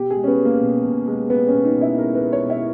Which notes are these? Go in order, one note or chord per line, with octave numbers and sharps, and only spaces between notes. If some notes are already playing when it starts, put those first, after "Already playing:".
Already playing: B2 G4
G#4
G#3
C#4
B3
G#3
A#3
B2
B2
G#3
G#3 B3
C#4
B2
D#4
B2
E4
G#3 A#4
B4
G#3
C#5
B2
E4